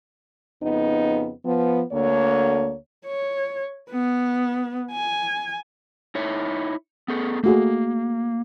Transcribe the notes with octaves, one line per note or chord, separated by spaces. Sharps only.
F2 C#3 B3 D#4
F3 B3
D2 D3 A#3 C#5
C#5
B3
G#5
D#4 E4 C#5
B3 G#4 A4
A3 A#3 F#4 G#4